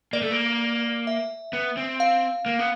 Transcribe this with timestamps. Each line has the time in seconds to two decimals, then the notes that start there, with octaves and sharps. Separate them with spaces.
0.13 A#3 D5
0.22 A3
0.31 A#3
1.07 E5
1.53 B3
1.77 C4
2.00 F5
2.46 A#3
2.59 B3